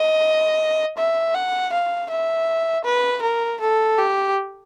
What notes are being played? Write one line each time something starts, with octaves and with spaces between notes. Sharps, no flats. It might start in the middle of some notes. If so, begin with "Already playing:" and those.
Already playing: D#5
E5
F#5
F5
E5
B4
A#4
A4
G4